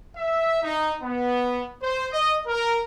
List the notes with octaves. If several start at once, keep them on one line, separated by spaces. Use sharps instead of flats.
E5
D#4
B3
C5
D#5
A#4